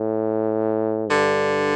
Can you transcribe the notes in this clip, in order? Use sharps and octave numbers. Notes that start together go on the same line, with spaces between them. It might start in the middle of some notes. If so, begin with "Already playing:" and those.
Already playing: A2
G2 D3